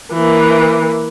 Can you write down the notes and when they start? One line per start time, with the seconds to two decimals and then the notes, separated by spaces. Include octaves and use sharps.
0.13 E3 A#3